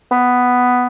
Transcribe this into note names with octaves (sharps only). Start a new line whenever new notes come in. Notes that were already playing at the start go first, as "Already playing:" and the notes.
B3